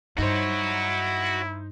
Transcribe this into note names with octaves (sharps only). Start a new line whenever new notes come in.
G2 D#4 E4 F#4 C5 C#5